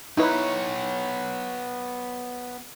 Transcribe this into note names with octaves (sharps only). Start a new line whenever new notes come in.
B3 D#4 E4 B4 C#5